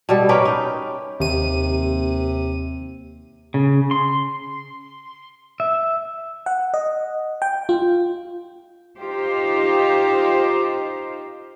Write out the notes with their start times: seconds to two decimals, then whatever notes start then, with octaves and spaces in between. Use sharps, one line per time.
0.09 B2 G3 A4
0.29 C#4 G4 A#4 B4
0.45 D#4
1.20 D#2 C3 D#7
3.54 C#3
3.91 C6
5.60 E5
6.46 F#5
6.74 D#5
7.42 G5
7.69 F4
8.97 D#4 F4 G4 C5